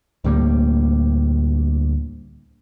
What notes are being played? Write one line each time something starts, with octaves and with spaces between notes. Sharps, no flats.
D2 A2 G3 A#3